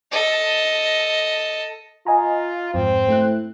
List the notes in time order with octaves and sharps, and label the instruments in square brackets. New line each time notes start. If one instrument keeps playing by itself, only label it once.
[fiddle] A4 D#5
[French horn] F4 [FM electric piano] D#5 G#5 A#5
[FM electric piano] F2 G#2 [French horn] C4
[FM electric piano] A3 E4 F#6